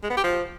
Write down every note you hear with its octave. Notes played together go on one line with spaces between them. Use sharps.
G#3
B3
G4
F3